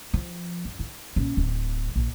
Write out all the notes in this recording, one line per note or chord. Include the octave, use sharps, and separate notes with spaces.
F3
F#2
D#4
A#1 C#4
D1 D3
A#1